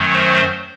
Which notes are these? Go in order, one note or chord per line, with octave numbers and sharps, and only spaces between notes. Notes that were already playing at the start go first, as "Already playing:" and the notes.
Already playing: F#2 D#3 F#3 A3
C5